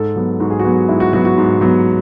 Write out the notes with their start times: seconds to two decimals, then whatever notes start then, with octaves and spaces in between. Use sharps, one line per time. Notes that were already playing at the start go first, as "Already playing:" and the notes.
Already playing: G#2 A4
0.16 F#3 B3
0.40 G#2 F#4
0.50 G#4
0.59 F#4
0.64 F#3 B3
0.89 G#2 E4
1.00 F#4
1.13 F#3 B3 F#4
1.25 F#4
1.38 G#2
1.61 F#3 B3